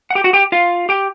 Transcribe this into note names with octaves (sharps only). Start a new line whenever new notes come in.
F#5
G4 G5
F#4 F#5
G4 G5
F4 F5
G4 G5